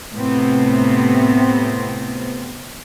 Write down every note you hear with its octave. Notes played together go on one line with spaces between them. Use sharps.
A2 C3 B3 C4